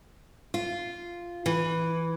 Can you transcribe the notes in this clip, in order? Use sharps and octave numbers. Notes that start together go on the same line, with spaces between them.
F4
E3